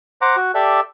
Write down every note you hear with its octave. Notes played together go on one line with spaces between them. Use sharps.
C5 F#5 A#5 D6
F#4
G4 A4 D5 E5